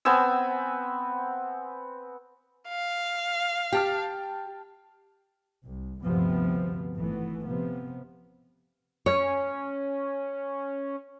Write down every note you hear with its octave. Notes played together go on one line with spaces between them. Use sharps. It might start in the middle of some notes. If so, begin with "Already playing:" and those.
B3 C4 G#5 E6
F5
G4 G5 A5 F6
C2
D2 G2 C3 F3 B3 C4
G#1 E3 A3 B3
C3 F3 B3
C#4 C#5